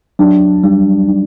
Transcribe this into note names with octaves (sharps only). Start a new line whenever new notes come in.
F#3 D4
G3 D4
D4